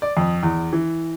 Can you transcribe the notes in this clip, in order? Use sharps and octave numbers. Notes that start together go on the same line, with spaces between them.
D5
F2
E2
E3